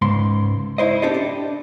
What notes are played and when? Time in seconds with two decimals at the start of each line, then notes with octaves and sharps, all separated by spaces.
0.02 C#2 G#2 C6
0.78 E4 C5 D#5
1.02 D4 G4 A4 C5 D#5
1.14 D4